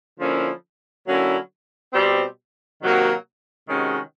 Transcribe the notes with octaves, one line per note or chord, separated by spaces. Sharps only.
D3 F3 A#3 C#4 E4
D3 F#3 A#3 C#4 E4
B2 G3 C4
C3 D#3 F#3 A#3
C3 D#3 G#3 C#4 F#4